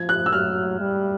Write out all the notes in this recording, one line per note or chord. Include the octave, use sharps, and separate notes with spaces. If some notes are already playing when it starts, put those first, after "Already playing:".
Already playing: F3 G#6
F#6
E6
F#3 F6
G3